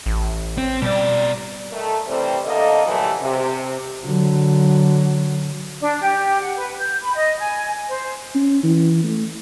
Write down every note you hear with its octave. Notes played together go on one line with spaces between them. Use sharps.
A1
C4
B2 G3 D5
D#3 A3
C3 E3 G3 A3 C4
D3 A3 A#3 A4 D#5
A#2 D3 E3 F#3 G3 A3
C3
D3 F#3
D4
G4
F#5
B4
G6
B5
D#5
G#5
C5
C#4
E3
A3